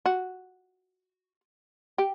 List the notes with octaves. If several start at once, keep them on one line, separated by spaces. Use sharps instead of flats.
F#4
G4